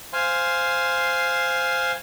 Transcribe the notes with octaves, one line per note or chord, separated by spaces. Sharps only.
C5 F5 G#5 C6